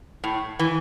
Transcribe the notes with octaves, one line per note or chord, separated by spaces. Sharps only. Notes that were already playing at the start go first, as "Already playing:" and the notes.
A2
E3